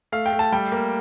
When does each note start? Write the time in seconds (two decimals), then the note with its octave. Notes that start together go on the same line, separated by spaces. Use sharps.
0.12 A3 F5
0.26 G5
0.33 A3
0.39 A5
0.52 G3 G5
0.72 A#3